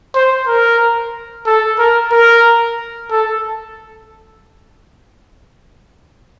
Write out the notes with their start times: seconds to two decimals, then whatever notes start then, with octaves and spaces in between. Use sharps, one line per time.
0.15 C5
0.47 A#4
1.47 A4
1.79 A#4
2.12 A#4
3.11 A4